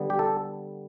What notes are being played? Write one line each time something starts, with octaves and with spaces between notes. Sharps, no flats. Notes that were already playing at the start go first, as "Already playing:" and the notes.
Already playing: D3 G3 B3
G4
A4